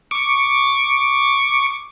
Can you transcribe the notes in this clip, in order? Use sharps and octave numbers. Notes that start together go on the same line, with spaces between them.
C#6 D6